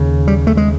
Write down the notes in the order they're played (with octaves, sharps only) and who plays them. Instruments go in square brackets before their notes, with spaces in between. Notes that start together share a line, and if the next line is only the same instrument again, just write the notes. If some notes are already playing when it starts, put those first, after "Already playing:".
Already playing: [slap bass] D#2 C#3
G3
A3
G#3